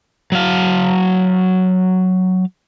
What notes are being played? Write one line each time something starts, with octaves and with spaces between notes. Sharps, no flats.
F#3 F5